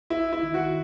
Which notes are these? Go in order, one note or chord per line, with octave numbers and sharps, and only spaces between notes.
E4
E4
D#3
F#4